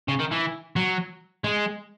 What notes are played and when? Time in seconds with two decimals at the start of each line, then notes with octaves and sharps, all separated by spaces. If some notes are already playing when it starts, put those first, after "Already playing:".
0.08 C#3
0.20 D#3
0.31 E3
0.76 F#3
1.44 G#3